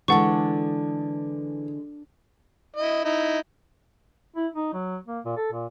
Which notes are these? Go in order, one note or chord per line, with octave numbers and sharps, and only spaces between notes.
D3 E3 G#3 D4 A4 F#5 C#6
E4 D#5
D#4 E4
E4
D#4
F#3
A#3
A#2
A4
A#2